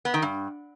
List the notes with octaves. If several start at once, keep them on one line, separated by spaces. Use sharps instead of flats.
B3
D#3
G2